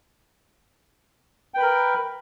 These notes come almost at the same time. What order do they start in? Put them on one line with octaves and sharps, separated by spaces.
G5 B4 B5 A#4